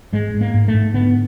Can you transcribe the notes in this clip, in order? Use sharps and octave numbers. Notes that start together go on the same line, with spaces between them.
G#2 G#3
G#2
A#3
G#2
A3
G#2
D3 B3